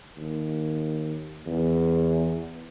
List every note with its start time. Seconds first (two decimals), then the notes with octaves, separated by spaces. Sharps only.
0.17 D#2
1.46 E2